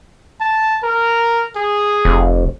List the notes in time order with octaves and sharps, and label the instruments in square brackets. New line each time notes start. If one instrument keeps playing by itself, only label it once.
[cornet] A5
A#4
G#4
[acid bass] F1